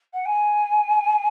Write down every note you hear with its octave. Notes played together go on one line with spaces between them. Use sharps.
F#5
G#5